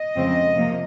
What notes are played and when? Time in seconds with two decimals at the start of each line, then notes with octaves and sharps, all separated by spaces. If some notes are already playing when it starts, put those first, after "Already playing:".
Already playing: D#5
0.15 F2 C#3 G#3 C4
0.56 C3 F3 A#3